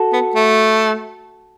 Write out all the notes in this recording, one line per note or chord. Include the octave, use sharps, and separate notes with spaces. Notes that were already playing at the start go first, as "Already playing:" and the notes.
Already playing: F#4 A4
B3
A3